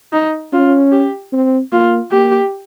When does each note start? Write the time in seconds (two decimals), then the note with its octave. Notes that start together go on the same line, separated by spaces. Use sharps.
0.13 D#4
0.53 C#4 F4
0.92 G4
1.33 C4
1.72 A#3 F4
2.11 A#3 G4